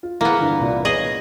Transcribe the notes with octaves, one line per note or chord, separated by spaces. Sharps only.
F4
A#3 B3 E4 G#4
G2 D3 E3
C2 A#2 D5
B3 G#4 C#5 D#5 F#7